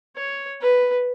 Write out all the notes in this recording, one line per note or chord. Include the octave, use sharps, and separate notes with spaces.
C#5
B4